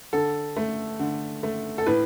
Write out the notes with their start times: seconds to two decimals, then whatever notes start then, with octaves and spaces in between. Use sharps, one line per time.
0.13 D3 A4
0.56 A3
0.99 D3
1.43 A3
1.78 A4
1.86 A2 B4